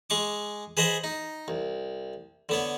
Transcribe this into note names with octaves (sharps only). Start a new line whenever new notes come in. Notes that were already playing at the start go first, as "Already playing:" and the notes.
G#3 G#4 C#6 D6
G#4 B4 C5 D#5 F#5 G#5
D#4
C2
D3 B3 C#5